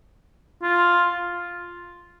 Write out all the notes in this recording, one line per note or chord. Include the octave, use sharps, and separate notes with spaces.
F4